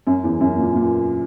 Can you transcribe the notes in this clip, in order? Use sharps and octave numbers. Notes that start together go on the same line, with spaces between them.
F#2
E2
F#2
A#2
A#2